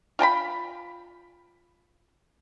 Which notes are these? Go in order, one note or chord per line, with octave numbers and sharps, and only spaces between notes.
F4 G5 A5 B5